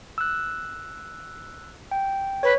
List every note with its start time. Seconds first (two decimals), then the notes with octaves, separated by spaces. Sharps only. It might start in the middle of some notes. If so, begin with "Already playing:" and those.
0.18 E6 F#6
1.91 G5
2.43 B4 C#5